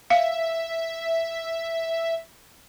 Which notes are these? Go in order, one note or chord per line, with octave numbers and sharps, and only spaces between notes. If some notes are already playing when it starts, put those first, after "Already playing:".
E5 F5